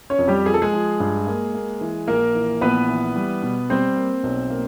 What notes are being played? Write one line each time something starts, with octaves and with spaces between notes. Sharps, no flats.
C#4 C#5
F2
G3 G4
F3 G#4
A4
G#3 G#4
F3
G2
A#3
A#3
E3
A#1 A#3 A#4
E3
A#1 B3 B4
E3
G3
B2
G3 C4 C5
A#3
B1
A#3